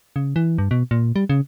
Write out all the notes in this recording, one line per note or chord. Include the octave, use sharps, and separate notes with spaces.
C#3
E3
G2
B2
A#2
G3
C#3